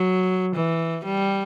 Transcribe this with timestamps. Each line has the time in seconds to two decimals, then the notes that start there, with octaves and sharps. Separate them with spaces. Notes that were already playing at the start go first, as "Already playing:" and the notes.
Already playing: F#3
0.56 E3
1.05 G3